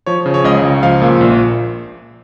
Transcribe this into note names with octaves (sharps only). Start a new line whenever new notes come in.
F3 C#5
C#3
C#5
C#2 D#5
C#2
F3 F5
A#2
A#1